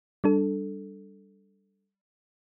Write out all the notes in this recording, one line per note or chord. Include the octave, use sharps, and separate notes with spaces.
G3 D4 A4